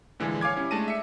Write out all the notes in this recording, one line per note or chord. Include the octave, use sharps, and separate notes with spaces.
A#2 D3 E3 F3 G#3
C#5 F5 G#5 D6 G#6
G3 C#4 E4
G#3 A3 D4 A5 A#6 D#7
E5 C#7